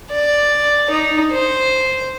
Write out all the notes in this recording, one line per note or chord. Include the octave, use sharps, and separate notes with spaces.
D5
D#4
C5